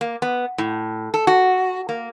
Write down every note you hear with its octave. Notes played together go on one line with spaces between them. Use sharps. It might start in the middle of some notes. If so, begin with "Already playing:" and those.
A#3
B3
A2
A4
F#4
A#3